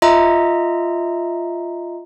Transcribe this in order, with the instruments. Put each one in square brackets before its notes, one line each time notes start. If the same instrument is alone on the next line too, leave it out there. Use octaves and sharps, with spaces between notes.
[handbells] F4 D#5 E5 A#5